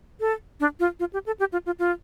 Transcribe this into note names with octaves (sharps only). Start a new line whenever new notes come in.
A4
D4
F4
F4
G4
A4
G4
F4
F4
F4